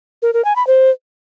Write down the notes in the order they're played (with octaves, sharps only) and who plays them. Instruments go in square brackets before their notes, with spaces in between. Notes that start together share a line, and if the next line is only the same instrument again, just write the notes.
[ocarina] A#4
A#4
G#5
B5
C5